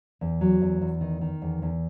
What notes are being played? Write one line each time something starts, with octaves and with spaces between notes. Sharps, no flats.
E2
F#3
E2
E2
D#3
D#3
E2
E2